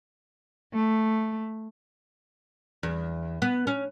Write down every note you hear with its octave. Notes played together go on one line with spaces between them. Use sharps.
A3
E2
B3
C#4